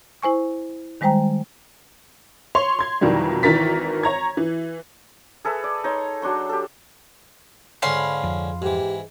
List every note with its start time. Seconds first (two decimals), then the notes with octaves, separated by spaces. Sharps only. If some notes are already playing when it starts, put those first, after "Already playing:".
0.23 E4 C5 G#5 C#6
1.01 D#3 G3 G#3 C5 G5 A#5
2.55 C#5 C6 F7
2.79 C6 G#6
3.01 F2 B2 D#3 E3 F#3 G3
3.43 G#1 D#3 E3 A#4 A6 B6
4.03 C#5 A#5 G#6
4.37 E3
5.45 G#4 A4 B4 E5
5.64 D5
5.84 D#4 C#5 C6
6.22 F#3 D4 C6 C#6
6.49 G4 A4
7.82 G#2 D3 C#4 F5 B5 C6
8.23 F2
8.62 G#2 E3 G4